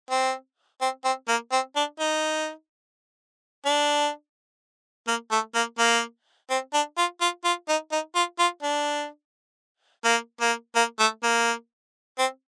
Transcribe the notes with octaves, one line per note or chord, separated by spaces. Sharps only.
C4
C4
C4
A#3
C4
D4
D#4
D4
A#3
A3
A#3
A#3
C4
D4
F4
F4
F4
D#4
D#4
F4
F4
D4
A#3
A#3
A#3
A3
A#3
C4